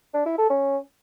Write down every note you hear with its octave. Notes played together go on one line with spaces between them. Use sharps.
D4
E4
A4
C#4